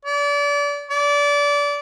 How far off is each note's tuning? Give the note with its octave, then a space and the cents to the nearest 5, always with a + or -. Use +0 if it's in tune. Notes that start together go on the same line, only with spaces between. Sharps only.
D5 -30
D5 -25